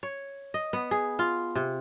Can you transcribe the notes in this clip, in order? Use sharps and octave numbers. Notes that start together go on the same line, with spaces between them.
C#5
D#5
B3
G#4
F4
C3